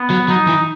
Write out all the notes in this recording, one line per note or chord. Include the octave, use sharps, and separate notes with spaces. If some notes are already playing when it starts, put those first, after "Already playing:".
Already playing: B3
F#3
F#3 D#4
E3